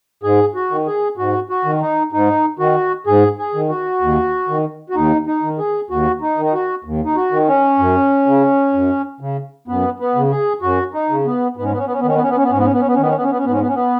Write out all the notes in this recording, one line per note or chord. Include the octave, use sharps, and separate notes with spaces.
G#2 G#4
F#4
D#3
G#4
G#2 F#4
F#4
D#3
D#4
G#2 D#4
D#3 F#4
G#2 G#4
G#4
D#3
F#4
D#2
D#3
F#4
D#2 D#4
D#4
D#3
G#4
D#2 F#4
D#4
D#3
D#4
F#4
D#2
D#4
F#4
D#3
C#4
F#2
C#3
F#2
C#3
F#2 B3
B3
C#3
G#4
F#2 F#4
D#4
C#3
B3
G#2 B3
C#4
B3
C#4
B3
C#4
B3
D#3 C#4
B3
C#4
B3
C#4
B3
G#2 C#4
B3
C#4
B3
C#4
B3
C#4
D#3 B3
C#4
B3
C#4
B3
C#4
G#2 B3
C#4
B3
C#4
B3